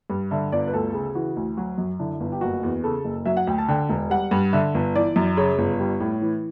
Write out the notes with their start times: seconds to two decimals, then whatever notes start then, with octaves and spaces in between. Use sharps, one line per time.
0.10 G2
0.31 D3 E5
0.52 G1 D5
0.67 B4
0.73 D2 A4
0.94 C#3
1.15 E3 F#4
1.36 D2
1.57 F#3 F#4
1.78 F#2
1.99 D3 E4
2.20 G1
2.32 G4
2.41 F#1 F#4
2.63 E2
2.84 C#3 A4
3.04 F#1
3.26 F#3 E5
3.37 F#5
3.47 D2 G5
3.58 A5
3.68 D3 G5
3.89 E1
4.10 G3 F#5
4.31 G2
4.53 D3 E5
4.74 G1
4.95 E3 D5
5.16 F#2
5.37 C#3 C#5
5.58 G1
5.80 G3
6.00 A2
6.22 E3